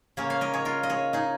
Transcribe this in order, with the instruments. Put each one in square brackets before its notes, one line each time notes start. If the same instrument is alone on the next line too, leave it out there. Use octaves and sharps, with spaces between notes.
[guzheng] C#3 A#3 C#4 G#4 C#5
C#5 F5
A#4 D#5
G#4 C#5
F4 A#4
D#5
G#4 C#5
D#4 G#4